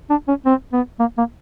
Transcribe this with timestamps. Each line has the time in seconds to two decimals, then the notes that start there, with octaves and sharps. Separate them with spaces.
0.10 D4
0.28 C#4
0.46 C4
0.73 B3
1.00 A#3
1.18 A#3